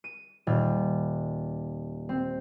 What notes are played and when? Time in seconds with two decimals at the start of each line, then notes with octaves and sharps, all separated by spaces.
0.04 D#7
0.47 D#1
2.09 C4